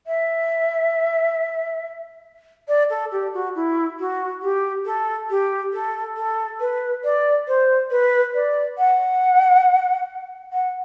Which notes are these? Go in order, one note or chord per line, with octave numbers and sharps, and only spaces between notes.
E5
D5
A4
G4
F#4
E4
F#4
G4
A4
G4
A4
A4
B4
D5
C5
B4
D5
F#5
F#5